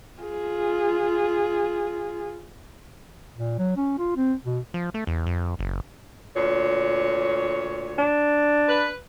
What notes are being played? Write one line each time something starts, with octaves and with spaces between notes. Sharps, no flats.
F4 G#4
A#2
F#3
C#4
F4
C4
B2
F3
A3
E2
F2
F#1
D2 A#2 C#5
D4
B4